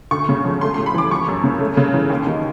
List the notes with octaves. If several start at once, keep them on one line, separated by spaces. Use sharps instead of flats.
D2 C#6
C#3
F3
A3 C6
A2 C6
B5
E3 D6
F3 C#6
F#2
C#3
A3
C#3
E3
D#2
D#3